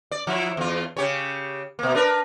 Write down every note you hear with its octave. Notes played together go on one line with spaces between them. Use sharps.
D5
F3 E4
E2 F4
C#3 G4 C#5
B2 A#3
D4 A#4 B4